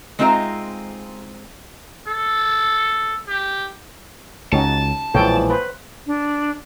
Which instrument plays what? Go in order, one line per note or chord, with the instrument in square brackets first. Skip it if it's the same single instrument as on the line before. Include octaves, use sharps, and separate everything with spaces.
[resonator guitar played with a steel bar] G#3 C4 D#4 F4 A#4 E5
[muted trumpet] A4
G4
[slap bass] C#2 [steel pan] C#4 D#4 F#4 [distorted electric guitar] A5
[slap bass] B1 A#2 G#3 [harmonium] E3 F3 [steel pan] A4 C#5 G5
[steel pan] B4 C5
[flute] D4